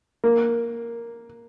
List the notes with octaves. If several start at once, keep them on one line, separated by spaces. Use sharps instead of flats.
A#3